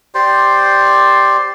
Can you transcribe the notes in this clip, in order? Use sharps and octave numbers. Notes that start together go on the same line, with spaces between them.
G4 C5 D5 C6